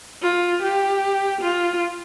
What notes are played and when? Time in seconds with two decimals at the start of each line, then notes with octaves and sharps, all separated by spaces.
0.23 F4
0.62 G4
1.41 F4